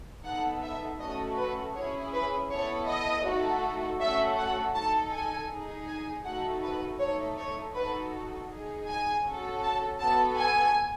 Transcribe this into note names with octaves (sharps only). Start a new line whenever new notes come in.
B3 D#4 A4 F#5
E5
A3 C#4 F#4 A4 D#5
B4
C#4 E4 G#4 C#5
B4
B3 E4 A4 C#5
D#5
A3 D#4 F#4 A4
A3 C#4 F#4 A4 E5
F#5
D#4 A4 A5
G#5
D#4 G#4
G#5
A3 D#4 F#4 A4 F#5
B4
A3 D#4 A4 C#5
C#5
D#4 F#4 A4 B4
D#4 G#4
G#5
C#4 F#4 A4
A5
B3 F#4 A4 A5
G#5